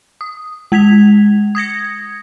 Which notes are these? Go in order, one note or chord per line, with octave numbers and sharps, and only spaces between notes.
D#6
G#3 G#6 B6 F7
D#6 G#6 A#6 C#7